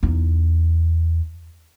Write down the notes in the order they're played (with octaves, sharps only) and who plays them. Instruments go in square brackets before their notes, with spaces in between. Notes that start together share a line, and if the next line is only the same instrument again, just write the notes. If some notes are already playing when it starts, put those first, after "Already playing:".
[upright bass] E2 D#4